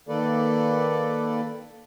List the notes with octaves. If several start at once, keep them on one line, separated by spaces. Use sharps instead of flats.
D#3 A#3 A4 B4 D5